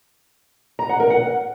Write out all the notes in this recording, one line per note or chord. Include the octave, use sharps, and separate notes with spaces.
A#5
F#5
A#4
F#5